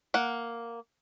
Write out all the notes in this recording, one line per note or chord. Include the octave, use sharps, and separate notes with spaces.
A#3 F#5